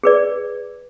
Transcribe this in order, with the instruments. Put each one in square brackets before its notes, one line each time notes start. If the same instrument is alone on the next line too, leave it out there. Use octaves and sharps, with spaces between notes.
[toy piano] G#4 B4 D5